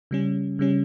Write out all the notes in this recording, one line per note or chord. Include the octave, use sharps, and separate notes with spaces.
C#3 G3 C#4
C#3 G3 C#4